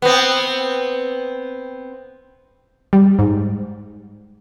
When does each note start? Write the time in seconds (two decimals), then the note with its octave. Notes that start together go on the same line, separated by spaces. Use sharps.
0.02 B3 C4
2.93 G3
3.19 G#2